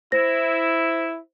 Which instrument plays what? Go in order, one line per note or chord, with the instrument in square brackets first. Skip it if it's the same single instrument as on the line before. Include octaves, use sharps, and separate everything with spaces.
[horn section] E4 [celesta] C5 A#6